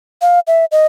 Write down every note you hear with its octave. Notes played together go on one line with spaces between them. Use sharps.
F5
E5
D#5